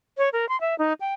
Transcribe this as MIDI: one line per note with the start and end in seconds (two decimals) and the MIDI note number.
0.18 0.29 73
0.33 0.48 70
0.49 0.59 84
0.61 0.77 76
0.78 0.93 63
1.00 1.14 79